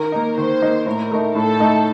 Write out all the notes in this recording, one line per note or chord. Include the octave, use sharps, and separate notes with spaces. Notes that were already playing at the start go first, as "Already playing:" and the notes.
Already playing: D#3 A#4
A#3 D#4
D#3 C5
A#3 D#4
A2 A#4
A3 D#4
A2 A4
A3 D#4